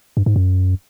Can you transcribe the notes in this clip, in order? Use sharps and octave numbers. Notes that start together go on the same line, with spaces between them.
G2
G#2
F#2